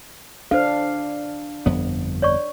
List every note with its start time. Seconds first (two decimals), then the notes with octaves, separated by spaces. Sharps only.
0.51 D4 A4 C5 F5
1.66 G1 F2 B3
2.22 C#5 D5 C#6